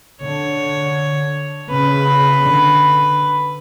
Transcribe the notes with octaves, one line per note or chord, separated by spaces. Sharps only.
D3 C#5
C#3 B4
D3